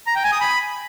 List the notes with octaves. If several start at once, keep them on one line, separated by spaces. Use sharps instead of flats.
A#5
G5
G#5
D#6
B5